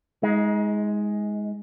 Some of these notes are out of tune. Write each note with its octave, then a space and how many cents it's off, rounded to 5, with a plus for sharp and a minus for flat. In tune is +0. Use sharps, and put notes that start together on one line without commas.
G#3 +0 D#4 +35